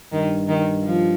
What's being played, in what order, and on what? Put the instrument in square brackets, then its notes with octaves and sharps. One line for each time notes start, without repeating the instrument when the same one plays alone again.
[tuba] G2 [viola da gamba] D#3
[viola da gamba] D#3
F3